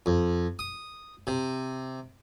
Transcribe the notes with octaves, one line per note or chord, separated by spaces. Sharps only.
F2
D#6
C3